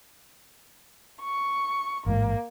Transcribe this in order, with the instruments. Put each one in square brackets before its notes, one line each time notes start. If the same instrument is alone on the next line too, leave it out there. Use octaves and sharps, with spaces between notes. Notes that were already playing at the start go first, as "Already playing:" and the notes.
[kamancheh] C#6
[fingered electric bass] A1 G#2 [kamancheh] A#3